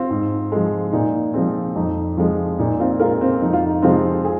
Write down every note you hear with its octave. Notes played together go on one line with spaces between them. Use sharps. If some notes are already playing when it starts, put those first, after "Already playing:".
Already playing: C4 F4
G#2
F3 G#3
A#2 D#4
F3 G#3 C4
F2 D#4
F3 G#3 C4
A#2 D#4
C4 F4
G#3 F4 A#4
C4
F2 D#4
F4
D#4
C3 F3 G#3 C4 F4
G#4